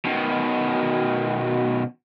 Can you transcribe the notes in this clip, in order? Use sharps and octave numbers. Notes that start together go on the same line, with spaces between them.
B2 D#3